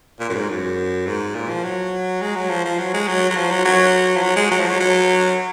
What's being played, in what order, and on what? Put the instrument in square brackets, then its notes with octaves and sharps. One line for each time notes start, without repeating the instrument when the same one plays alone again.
[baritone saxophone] A#2
F#2
G#2
F#2
G#2
A#2
F3
F#3
G#3
F#3
F3
F3
F#3
G#3
F#3
F#3
F3
F#3
F#3
F3
F#3
G#3
F#3
F3
F#3
F#3